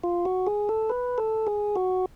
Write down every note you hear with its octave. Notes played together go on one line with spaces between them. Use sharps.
F4
F#4
G#4
A4
B4
A4
G#4
F#4